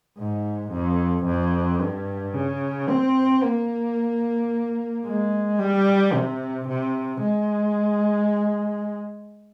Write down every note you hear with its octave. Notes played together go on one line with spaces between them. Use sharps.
G#2
F2
F2
G2
C#3
C4
A#3
G#3
G3
C3
C3
G#3